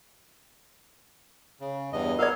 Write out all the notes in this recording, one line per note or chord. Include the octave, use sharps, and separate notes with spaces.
C#3
E2 G2 D#5
A#3 B3 A#4 D5 F5